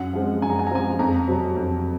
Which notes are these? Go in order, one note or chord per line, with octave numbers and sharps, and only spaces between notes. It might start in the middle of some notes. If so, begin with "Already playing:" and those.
Already playing: F#2 F#5
F3 G#3 C4
F#2 G#5
A#5
G#5
A#5
F3 G#3 C4 G#5
F2 A#5
C3 F#3 C4
F2